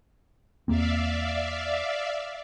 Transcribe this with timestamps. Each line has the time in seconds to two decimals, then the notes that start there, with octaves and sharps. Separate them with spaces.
0.68 E2 A#3 C4 D5 E5 F5